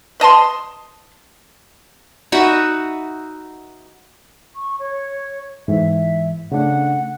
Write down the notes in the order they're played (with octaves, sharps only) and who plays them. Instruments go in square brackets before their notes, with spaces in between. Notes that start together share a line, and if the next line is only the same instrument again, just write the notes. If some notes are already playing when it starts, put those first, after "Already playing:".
[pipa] B4 D#5 A5 C6
[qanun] D#4 F#4 B4 E5
[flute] C#6
C#5
[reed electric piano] G#2 E3 [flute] E5
[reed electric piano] C#3 A3 D4 [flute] F#5